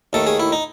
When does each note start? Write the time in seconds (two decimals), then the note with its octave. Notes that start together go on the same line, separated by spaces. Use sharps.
0.13 D#2 D#3 A3 A4
0.27 G#4
0.40 E4
0.52 D#4